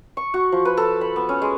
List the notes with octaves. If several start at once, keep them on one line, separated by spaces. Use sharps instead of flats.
C#6
F#4
F3
B4
A4
B5
B3
C#4
G#3